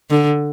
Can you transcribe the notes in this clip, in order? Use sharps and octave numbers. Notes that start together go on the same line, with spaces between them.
D3